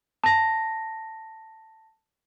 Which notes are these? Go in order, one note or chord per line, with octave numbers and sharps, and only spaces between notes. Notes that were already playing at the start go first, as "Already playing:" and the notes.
A5 A#6